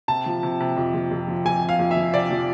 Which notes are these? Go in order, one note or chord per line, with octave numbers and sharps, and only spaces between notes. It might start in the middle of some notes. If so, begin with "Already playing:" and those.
C3 A5
F3
C3
C3
F2
F2
F2
F3
F2 G#5
C3
F5
F2
E5
F3
C3 D5
F3